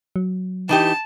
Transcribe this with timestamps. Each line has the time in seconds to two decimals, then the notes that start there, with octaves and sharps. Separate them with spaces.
0.16 F#3
0.69 E3 D#4 G4 A5